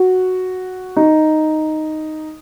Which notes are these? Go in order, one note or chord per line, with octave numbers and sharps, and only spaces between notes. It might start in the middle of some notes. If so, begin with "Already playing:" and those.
Already playing: F#4
D#4